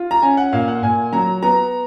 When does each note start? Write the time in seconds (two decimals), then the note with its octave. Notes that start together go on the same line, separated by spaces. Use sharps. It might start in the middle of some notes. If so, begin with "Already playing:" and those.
Already playing: F4
0.11 A#5
0.22 C#4 G#5
0.37 F#5
0.52 A#2 F5
0.68 F#5
0.82 A#2 G#5
1.13 F#3 A#5
1.43 B3 A#5